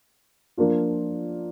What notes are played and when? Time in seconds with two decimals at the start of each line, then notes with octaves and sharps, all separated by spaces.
0.57 F3 A#3 D4 F4